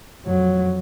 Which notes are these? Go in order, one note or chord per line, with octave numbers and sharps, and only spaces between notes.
F2 F#3